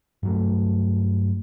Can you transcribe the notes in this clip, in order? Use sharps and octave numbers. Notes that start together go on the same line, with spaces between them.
G2 F#3 A3